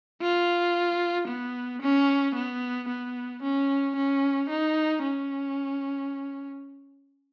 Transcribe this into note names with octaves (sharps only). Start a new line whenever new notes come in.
F4
B3
C#4
B3
B3
C#4
C#4
D#4
C#4